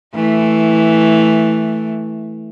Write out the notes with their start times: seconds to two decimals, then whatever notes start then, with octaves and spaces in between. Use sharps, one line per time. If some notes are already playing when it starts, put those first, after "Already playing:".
0.14 E3 A3